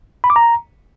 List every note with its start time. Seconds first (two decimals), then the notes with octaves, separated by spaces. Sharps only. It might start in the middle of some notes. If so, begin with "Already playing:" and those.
0.24 B5
0.30 D6
0.36 A#5